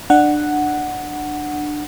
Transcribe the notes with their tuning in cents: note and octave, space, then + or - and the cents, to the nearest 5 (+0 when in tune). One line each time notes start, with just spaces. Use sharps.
D4 +20 F#5 +0